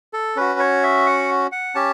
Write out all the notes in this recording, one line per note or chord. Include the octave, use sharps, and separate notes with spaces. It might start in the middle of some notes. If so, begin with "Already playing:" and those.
A4
C#4 F#4 B4
C#5
E5
F#5
F#5
C#4 G4 A5